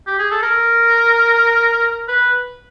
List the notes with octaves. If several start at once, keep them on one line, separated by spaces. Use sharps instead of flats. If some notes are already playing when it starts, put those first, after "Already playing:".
G4
G#4
A4
A#4
B4